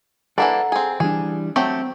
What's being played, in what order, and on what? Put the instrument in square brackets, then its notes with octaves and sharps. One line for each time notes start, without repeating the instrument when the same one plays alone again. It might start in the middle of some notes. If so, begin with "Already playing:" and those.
[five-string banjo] E3 A#3 D4 [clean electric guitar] A4 F#5 A#5
[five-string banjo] C4 G#4
[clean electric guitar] E3 G3 D4 [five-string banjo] G#4
[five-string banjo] F#3 A3 G4 [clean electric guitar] C4